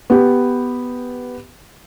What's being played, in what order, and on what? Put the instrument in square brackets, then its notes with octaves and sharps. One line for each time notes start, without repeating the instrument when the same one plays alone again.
[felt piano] B3 G4